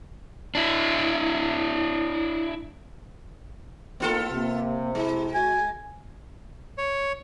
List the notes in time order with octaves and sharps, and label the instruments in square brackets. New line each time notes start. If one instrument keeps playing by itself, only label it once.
[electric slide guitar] D4 E4
[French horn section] A2 A#3 D#4 [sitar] B3 F4 A4
[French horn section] C3 [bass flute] A#3
[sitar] G#3 [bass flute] E4
[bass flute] F#4 [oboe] G#5
[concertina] C#5